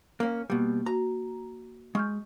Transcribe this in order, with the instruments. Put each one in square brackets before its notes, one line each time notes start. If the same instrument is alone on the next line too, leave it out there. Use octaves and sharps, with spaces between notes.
[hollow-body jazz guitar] A#3 C#4
[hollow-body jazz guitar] B2 G3 [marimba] A#3
[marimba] F#4 [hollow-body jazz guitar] A#5
[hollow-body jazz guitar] G#3 [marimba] C#6 F6 G6